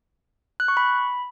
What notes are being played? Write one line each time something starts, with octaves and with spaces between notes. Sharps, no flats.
F#6
C#6
B5